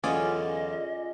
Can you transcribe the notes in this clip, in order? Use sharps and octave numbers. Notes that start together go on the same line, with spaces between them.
E2 D3 F#3 C#4 F4 G#4 D5 D#5